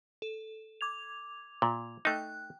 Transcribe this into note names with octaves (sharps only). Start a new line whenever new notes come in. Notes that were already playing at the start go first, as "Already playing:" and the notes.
A4
D6 G#6 F7
A#2
A3 D#4 G5 F#6